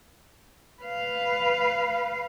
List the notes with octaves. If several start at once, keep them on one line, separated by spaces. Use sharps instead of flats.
B4 F5